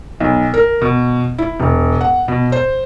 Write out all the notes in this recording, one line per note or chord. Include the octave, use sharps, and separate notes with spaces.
B1
A#4
B2
E4
E1
F#5
B2
C5